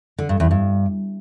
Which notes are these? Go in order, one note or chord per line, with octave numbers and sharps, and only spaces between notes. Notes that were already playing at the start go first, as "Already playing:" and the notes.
D3
G2
E2
G2